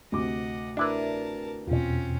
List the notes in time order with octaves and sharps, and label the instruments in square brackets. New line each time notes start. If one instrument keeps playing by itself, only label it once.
[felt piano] D2 C3 D6 [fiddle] D#5 F#5
[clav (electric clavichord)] D4 E4 B4 [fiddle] A#4 A5
[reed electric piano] E2 B2 [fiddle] C4 C#4 [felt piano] F4